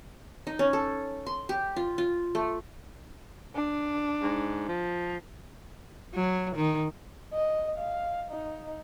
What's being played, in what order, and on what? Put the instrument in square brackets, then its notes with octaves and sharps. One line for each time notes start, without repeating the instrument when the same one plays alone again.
[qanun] D#4
C#4
A4
C6
G4
F4
F4
A3
[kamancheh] D4
[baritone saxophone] G#2
F3
[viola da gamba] F#3
D#3
[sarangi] D#5
F5
D#4